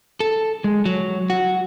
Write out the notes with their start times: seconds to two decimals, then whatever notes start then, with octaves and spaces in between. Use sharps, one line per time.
0.20 A4
0.64 G#3
0.86 F#3
1.30 F#4